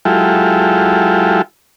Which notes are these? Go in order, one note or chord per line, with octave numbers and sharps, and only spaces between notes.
F#3 G#3 E4 F4 G4 A4